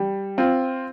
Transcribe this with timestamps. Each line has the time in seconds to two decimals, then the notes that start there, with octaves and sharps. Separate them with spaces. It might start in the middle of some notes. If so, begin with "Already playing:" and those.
Already playing: G3
0.38 C4 F4